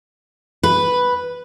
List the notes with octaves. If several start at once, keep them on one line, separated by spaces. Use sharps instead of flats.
B4